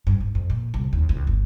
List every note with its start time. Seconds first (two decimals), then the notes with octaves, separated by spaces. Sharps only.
0.07 G2
0.20 G#2
0.35 F2
0.50 A#2
0.74 C2
0.93 D#2
1.09 C#2
1.27 G1